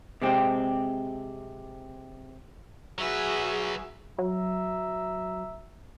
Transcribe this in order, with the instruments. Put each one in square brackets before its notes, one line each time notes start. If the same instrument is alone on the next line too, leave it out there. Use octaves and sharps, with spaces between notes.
[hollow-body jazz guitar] C3 G#3 C4 G4
[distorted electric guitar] F#3 B4 [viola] F#4 E5 [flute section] G#4
[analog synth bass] F#3 [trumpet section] E5 A#5